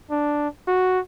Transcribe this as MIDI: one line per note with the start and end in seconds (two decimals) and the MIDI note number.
0.11 0.48 62
0.68 1.00 66